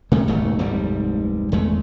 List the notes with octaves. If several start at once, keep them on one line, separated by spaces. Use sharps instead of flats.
G1 C3 G#3 A3
D#1 G#2 B2 A3
F1 D2 G#2 G3
G#1 E2 G#3 A3